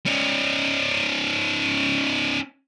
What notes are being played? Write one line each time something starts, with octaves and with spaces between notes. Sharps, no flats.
C#4 D#4